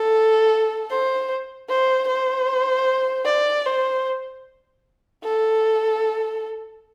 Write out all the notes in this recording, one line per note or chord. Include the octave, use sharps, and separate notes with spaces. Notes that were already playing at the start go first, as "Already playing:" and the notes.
Already playing: A4
C5
C5
C5
D5
C5
A4